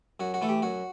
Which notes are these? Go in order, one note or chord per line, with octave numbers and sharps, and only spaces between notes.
F#2 F#4
F#4
E3 A3 A4
G4
F#2 F#4